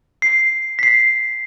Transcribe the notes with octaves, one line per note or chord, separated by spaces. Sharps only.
C7
B6 C7